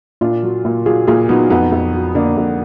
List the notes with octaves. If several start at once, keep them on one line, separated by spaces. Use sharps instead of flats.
A#2 D4 F4
F#3
A#2
F#3 F4 G#4
A#2 F4 G#4
F#3 B3 D#4
F2 B3 D#4
F2
F#3
D3 A#3 D4
F2